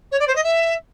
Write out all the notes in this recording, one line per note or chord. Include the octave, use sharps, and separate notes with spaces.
C#5
D5
C5
D#5
E5